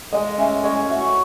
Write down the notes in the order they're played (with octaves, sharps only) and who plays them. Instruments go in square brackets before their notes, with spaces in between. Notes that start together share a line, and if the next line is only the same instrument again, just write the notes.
[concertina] G#3 [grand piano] D#5
[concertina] C#4 [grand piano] E5
[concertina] C#5 [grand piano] D#5
[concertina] F#4 [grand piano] E5